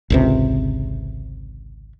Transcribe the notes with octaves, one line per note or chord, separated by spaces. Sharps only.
G#1 C#2 C3